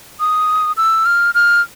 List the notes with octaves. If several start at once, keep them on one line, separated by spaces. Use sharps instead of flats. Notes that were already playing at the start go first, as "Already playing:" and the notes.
D#6
E6
F6
F6